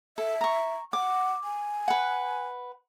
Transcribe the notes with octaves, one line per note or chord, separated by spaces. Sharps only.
A4 E5
A#5 C#6
F#5 D6
G#5
B4 F#5